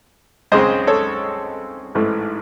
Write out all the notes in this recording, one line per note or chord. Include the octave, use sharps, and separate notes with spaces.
C#2 C#3 G#3 C4 C5 D#5
A4 C#5
A1 G#2 E3 A3